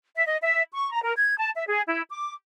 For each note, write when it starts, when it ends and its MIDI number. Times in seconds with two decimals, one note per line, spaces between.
0.14 0.23 76
0.26 0.36 75
0.41 0.62 76
0.72 0.90 85
0.92 1.01 82
1.03 1.12 70
1.16 1.36 92
1.36 1.50 81
1.54 1.64 76
1.66 1.80 68
1.86 2.02 64
2.10 2.32 86